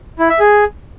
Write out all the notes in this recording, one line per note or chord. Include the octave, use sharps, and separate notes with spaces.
E4
E5
G#4